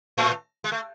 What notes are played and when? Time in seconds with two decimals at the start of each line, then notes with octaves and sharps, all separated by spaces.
0.18 A2 A3
0.64 G#3
0.72 A3